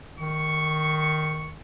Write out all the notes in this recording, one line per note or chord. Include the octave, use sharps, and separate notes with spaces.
D#3 C#6